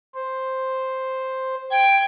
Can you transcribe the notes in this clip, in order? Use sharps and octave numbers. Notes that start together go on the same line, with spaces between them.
C5
G5 G#6